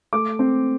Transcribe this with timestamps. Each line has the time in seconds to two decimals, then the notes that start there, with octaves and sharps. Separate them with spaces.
0.13 A3 D6
0.39 C4